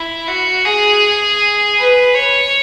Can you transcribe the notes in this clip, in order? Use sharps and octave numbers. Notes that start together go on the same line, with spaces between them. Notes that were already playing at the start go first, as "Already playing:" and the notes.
Already playing: E4
F#4
G#4
B4
C#5